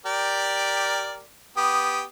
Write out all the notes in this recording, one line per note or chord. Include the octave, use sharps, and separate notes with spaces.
G4 A#4 D5
B3 G4 D#6